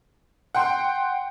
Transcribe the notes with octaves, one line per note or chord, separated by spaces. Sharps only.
F#5 G5 C6